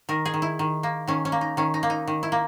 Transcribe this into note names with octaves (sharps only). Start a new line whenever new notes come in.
D#3 A#4
G#4
D#3
E4
D#3
A#3
D#3 C#4
C#4
A#3
D#4
D#3 C#4
D#4
A#3
D#4
D#3
E4
A#3